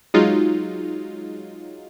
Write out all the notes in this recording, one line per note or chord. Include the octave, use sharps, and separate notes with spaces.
F#3 G#3 D#4 F4